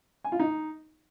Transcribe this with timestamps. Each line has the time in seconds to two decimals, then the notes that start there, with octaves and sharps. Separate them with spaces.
0.24 G#5
0.32 F4
0.39 D#4